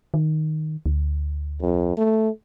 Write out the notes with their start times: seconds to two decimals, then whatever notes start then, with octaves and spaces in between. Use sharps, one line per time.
0.14 D#3
0.86 D2
1.62 F2
1.97 A3